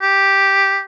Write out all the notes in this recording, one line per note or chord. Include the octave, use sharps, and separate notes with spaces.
G4